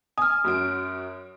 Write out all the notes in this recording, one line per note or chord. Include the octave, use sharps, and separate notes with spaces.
G#5 D#6 F6
F#2 F#4 D7